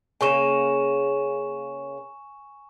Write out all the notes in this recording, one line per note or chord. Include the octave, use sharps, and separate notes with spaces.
C#3 A#3 C#4 G#5 C#6 E7